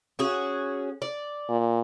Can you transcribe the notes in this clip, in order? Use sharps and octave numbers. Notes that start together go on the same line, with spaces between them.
C#4 F#4 G#4
D5
A#2